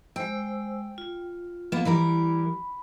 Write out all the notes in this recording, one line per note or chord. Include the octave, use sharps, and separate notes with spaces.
G#3 C5 G5 E6
F4
A#3 B3
E3 G3 A#4 B5